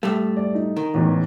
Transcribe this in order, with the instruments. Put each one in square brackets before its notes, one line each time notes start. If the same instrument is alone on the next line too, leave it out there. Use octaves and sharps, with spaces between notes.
[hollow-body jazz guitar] A2 G3 A3
[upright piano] D5
D#4
[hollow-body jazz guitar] D#3
[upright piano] A1 E2 G#2